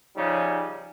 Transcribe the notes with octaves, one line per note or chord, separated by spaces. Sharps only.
C#3 F3 G3 C#4 D#4